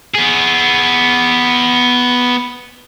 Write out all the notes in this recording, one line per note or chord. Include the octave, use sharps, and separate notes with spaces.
B3 G#4